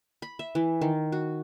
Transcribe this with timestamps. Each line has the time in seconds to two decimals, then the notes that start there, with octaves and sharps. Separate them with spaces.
0.22 B5
0.39 E5
0.55 E3
0.81 D#3
1.12 F#4